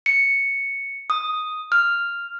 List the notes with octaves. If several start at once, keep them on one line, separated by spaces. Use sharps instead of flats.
C#7
D#6
F6